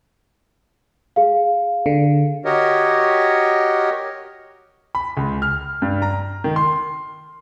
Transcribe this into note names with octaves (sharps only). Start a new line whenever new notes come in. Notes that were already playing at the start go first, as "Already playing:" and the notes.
G#4 F5
D3
F#4 G4 A#4 C#5 D#5
B5
C#2
F6
G2
A#5
D#3
C6